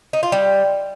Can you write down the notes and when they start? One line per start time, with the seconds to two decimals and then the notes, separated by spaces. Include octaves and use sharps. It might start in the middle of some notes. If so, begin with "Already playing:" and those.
0.13 D#4
0.23 F4
0.32 G3